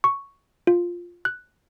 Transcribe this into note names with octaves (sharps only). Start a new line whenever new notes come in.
C#6
F4
F#6